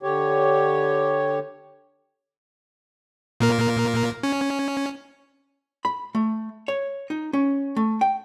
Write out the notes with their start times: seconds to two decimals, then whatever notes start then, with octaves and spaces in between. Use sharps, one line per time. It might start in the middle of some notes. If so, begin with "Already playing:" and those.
0.03 D3 G4 C#5
3.40 A#2 A#3 A#4
4.23 C#4
5.85 B5
6.15 A3
6.68 C#5
7.10 D#4
7.33 C#4
7.77 A3
8.01 G5